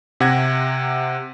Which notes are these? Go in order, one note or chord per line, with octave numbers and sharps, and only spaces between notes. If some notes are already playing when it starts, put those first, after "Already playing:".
C3 F#5 G#6 A#6